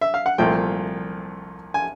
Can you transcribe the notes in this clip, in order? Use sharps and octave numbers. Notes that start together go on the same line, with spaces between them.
E5
F5
F#5
C2 A#2 F3 A3 G5
G#5